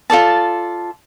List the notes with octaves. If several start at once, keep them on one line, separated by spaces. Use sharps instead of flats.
F4 A4 D5 A5